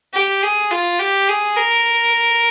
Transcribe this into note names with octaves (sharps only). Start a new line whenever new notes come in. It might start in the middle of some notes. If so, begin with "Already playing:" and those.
G4
G#4
F4
G4
G#4
A#4